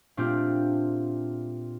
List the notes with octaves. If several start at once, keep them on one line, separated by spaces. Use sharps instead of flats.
A#2 A3 C4 D4 F4 G4